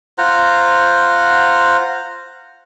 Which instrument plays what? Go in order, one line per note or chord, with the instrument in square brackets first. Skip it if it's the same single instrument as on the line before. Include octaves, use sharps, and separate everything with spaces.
[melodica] F4 C5 F#5 A#5